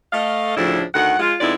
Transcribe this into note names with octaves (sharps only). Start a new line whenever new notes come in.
A3 D#5 F5
D2 A2 C#3 F3 D4 E4
D2 D#3 A3 F#5
G#3 F4
F2 G#3 B3 D#4 E4 D5